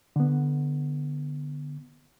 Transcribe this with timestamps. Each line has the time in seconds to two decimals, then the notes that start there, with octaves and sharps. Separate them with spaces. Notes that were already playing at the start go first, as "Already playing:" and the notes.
0.16 D3 B3